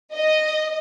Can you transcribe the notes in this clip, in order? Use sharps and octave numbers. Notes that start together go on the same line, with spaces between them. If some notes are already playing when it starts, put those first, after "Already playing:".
D#5